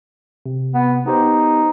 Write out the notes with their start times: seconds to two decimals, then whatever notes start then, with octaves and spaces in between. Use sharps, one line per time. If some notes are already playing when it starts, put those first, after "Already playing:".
0.46 C3
0.74 B3
1.06 B3 D#4 G4 C5